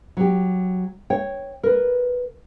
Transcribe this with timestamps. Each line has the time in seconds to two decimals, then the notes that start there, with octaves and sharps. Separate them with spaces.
0.17 F#3 G4
1.10 C#5 G5
1.63 A#4 B4